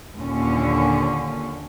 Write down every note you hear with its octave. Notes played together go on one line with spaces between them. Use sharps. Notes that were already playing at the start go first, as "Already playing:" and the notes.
D#2 A#2 D3 C#4